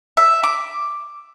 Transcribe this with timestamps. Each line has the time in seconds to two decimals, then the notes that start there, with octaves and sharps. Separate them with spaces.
0.17 E5
0.43 D6